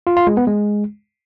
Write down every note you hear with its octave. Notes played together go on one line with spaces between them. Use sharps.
F4
F4
G#3
B3
G#3